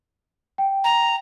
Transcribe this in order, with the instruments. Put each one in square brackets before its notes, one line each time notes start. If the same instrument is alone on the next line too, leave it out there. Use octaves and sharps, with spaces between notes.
[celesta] G5
[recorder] A#5